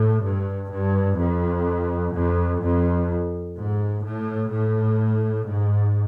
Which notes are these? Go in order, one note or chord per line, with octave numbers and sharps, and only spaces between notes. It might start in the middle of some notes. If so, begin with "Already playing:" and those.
Already playing: A2
G2
G2
F2
F2
F2
G#2
A2
A2
G#2